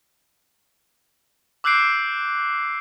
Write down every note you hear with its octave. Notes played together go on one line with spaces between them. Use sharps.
D6 E6 F#6 G6 C7 D7